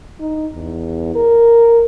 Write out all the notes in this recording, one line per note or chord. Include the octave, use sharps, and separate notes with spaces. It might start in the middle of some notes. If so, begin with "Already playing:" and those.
D#4
E2
A#4